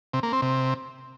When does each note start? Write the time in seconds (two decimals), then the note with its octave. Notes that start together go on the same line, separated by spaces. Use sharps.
0.14 C3
0.23 A#3
0.33 C4
0.42 C3